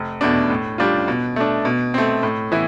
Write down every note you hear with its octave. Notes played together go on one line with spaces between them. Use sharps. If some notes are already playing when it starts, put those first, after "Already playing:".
Already playing: F1
E2 B2 A3 D4
A2
G3 D4 F4
B2
A3 D4
B2
A3 C4
A2
E3 B3 E4